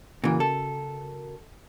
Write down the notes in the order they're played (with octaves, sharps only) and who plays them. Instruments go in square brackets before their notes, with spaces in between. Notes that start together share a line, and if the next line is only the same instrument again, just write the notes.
[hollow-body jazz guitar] A#2 E3 [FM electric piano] C#3 F#4 A#4
[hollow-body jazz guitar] A4